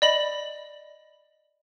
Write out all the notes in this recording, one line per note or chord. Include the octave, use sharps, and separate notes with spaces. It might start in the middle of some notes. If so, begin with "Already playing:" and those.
D5 D#5 B5 F#7